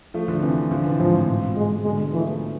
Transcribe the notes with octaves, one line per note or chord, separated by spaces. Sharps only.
F3 A3
D3 F3
C3 E3
D3 F3
C3 E3
G#2 F3
A2
G#2 B2
G#3
B2 D3 G#3
E3 F3 A3